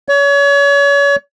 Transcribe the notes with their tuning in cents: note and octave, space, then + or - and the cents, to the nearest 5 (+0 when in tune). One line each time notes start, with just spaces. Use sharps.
C#5 +35